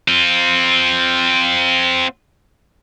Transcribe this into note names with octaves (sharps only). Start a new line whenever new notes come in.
C4 F4